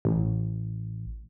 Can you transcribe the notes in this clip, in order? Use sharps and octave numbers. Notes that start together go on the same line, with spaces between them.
A1